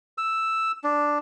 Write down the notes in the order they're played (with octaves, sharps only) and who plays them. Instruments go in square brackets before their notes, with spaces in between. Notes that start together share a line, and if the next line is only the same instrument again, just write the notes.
[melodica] E6
D4